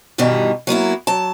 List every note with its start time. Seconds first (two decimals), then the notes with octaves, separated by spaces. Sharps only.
0.18 G2 B2 D#3 E3 G3
0.67 F#3 A#3 B3 E4
1.07 F#3 A5